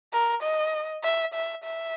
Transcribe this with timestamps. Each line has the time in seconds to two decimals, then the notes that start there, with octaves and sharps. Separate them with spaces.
0.13 A#4
0.43 D#5
1.04 E5
1.34 E5
1.64 E5